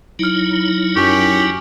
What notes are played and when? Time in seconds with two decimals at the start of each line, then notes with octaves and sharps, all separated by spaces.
0.19 F#3 D#4 E4 F6 D7
0.96 F#2 G4 G#5 C#6